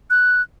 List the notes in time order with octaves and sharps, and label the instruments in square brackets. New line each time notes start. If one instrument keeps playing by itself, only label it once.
[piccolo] F#6